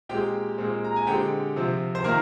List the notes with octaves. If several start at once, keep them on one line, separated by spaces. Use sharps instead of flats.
A#2 G#3 C4 G4 G5
A#2 G#3 C4
A#5
G#5
D3 G#3 C4 G4 G5
C3 F3 C4
C5
D#3 A#3 A#4